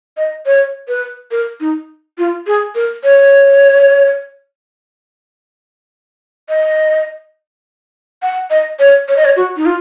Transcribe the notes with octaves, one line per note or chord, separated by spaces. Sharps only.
D#5
C#5
B4
A#4
D#4
F4
G#4
A#4
C#5
D#5
F#5
D#5
C#5
C#5
D#5
C#5
F#4
D#4
F4